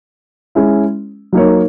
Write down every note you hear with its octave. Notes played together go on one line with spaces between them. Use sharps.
G#3 C#4 E4
F#3 A#3 D#4 A#4 C#5